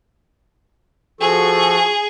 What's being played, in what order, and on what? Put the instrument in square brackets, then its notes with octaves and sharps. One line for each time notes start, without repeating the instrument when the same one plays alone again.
[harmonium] F3 F#4 A4 [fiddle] G#4